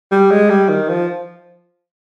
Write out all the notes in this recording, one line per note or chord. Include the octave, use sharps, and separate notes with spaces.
G3
G#3
G3
D#3
F3